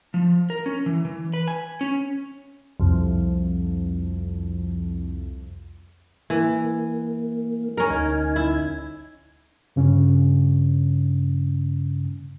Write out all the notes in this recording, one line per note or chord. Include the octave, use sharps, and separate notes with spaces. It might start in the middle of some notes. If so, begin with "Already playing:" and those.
F3
A#4
C#4
E3
E3
B4
G#5
C#4
C2 F2
E3 A#3
C#4 A#4
D2 D#4 G#5
E4
G2 C#3 C#4